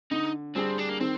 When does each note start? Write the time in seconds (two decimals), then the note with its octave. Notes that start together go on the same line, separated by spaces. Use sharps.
0.11 D3 D#4
0.55 G3 C4 D4 G#4
0.78 D4
0.89 A#3
1.00 D#3 C4